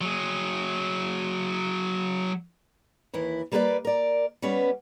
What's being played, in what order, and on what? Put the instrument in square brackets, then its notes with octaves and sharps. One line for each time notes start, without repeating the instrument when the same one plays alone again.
[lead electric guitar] F#3 G#4
[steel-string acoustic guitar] D#2 E3 E4
G3 A#3 F#4 G#4 B4 D5
A#4 D5
G3 B3 C#4 B4